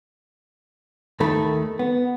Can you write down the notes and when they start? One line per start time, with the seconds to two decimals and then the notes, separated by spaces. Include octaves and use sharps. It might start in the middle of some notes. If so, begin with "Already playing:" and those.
1.20 D#2 D#3 A3 A4 B5
1.79 B3